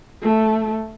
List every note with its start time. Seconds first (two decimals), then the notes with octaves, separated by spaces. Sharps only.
0.22 A3